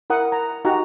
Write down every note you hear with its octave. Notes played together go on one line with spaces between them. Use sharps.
E4 A#4 F#5 D#6
A#5
D#4 F#4 G4 F#5 A#5